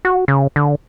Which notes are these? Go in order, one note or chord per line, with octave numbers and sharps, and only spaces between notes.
F#4
C#3
D3